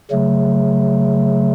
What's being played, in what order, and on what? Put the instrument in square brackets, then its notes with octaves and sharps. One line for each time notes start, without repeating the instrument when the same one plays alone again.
[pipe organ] C#3 F#3 A3